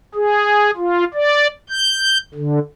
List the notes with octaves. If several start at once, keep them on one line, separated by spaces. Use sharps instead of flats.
G#4
F4
D5
G6
D3